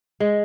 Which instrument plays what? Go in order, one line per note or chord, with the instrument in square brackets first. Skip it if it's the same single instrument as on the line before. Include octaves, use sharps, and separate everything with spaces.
[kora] G#3